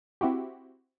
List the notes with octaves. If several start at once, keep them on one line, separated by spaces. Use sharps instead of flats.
C4 E4 F#4 G4